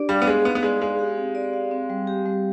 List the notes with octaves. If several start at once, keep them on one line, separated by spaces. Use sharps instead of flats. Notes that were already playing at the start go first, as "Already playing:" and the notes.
Already playing: D4 G4 D5
G3 F5
B3
G#3 G#4
B3 D#4
B3
G#3 D5
G#3 F5
G4
C4
D5
F5
C4
G3
G4
G3